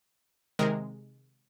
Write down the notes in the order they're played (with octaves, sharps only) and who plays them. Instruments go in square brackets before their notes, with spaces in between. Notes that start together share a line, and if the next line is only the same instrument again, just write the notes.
[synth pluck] C3 D#3 G#3 A#4